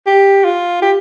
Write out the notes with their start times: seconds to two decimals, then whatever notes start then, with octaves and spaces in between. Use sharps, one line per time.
0.07 G4
0.44 F4
0.82 G4